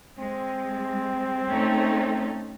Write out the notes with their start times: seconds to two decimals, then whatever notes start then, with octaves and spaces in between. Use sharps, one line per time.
0.19 G#3 C4
1.48 A3 C#4 D#4